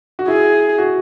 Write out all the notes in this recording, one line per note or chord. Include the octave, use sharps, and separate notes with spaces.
F#4
E4 G#4
F#4